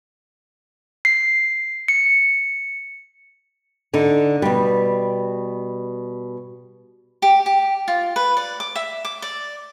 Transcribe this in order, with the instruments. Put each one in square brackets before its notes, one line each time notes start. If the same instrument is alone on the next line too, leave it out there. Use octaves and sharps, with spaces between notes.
[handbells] C7
C#7
[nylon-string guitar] D3 D#4
B2 G3
[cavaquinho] G4
G4
F4
B4
D5
D6
E5
D6
D5